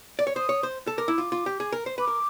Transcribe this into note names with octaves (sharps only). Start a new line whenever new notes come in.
D5
C#5
C5 D#6
C#5
C5
A4
A#4 D6
E4
F4
F4
G4
G#4
A#4
C5
B4 D6
A#4